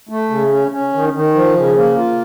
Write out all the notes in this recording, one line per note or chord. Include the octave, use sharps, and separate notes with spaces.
A3
C#3
C#4
C#4
D#3
D#3
F3
C#3
A#3
F4